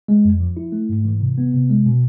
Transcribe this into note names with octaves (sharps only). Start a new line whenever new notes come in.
G#3
F2
F3
E4
A3
G#2
E3
C3
B3
C3
G#3
B2